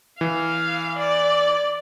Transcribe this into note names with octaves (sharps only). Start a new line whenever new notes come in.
E3 F5
D5